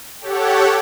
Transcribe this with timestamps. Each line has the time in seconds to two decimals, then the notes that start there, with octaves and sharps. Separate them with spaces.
0.20 G4 A4 C#5 F#5